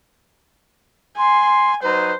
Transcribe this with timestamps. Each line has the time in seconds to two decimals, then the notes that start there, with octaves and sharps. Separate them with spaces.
1.18 G#5 C6
1.82 F#3 D#4 B4 C5